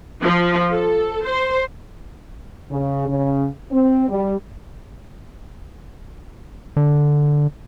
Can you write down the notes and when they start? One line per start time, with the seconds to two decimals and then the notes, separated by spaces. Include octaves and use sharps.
0.22 F3
0.73 A4
1.27 C5
2.70 C#3
3.08 C#3
3.71 C4
4.09 G3
6.77 D3